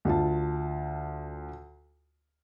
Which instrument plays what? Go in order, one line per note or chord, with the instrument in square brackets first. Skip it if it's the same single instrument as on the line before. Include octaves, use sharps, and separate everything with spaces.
[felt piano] D2 F4 A5